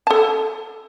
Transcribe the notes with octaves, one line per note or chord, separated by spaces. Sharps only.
A4 A5